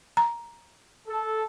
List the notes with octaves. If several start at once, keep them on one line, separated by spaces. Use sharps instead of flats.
A#5
A4